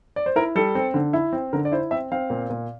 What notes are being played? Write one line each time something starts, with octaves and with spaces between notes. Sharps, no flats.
D5
C5
E4 A#4
G3 A4
C4
D3
E4
C4
D3 A#4
D5
E4 C5
C4 E5
C4 F5
A#2
A#2